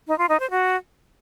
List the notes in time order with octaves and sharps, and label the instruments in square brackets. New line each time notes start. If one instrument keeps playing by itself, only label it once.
[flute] D#4
F4
D#4
C5
F#4